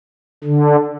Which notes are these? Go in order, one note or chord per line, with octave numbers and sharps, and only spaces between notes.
D3